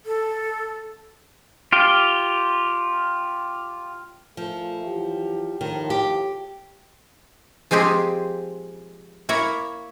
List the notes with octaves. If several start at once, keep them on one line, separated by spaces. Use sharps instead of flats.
A4
F4 G4
A#2 F3 A3
E3 F#3 G4
D#2 A2 D#3 F3
G4
F3 G#3 C4 G4 G#4
A#3 E4 C#5 E5 A#5